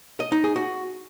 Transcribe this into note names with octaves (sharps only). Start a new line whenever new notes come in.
D#5
D#4
G#4
F#4